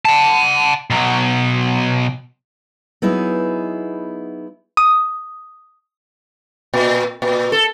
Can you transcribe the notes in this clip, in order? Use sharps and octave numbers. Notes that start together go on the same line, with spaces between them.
F#5 A5
B2 F#3
F#3 B3 D#4 E4 G#4
D#6
A#2
A#2
A4